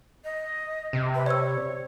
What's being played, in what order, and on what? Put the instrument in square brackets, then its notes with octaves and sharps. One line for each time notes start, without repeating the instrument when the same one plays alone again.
[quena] D#5
[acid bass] C3
[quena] B4
[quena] C#5 [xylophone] D5 E6